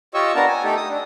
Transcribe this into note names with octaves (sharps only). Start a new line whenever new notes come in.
F4 G4 C#5 D#5 C#6 E6
B3 D4 A#4 A5 A#5
G#5
A3 D#4 G4 A4
D#6
D4